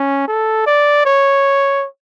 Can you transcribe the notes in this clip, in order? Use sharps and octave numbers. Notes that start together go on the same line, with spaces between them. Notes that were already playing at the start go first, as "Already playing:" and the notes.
Already playing: C#4
A4
D5
C#5